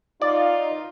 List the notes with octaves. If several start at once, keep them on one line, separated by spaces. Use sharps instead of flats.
D#4 F4 D5